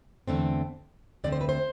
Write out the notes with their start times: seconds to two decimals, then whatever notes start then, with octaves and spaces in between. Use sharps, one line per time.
0.28 E2 D3 A3 C4
1.24 D2 D3 A3 C4 D5
1.32 C5
1.41 B4
1.49 C5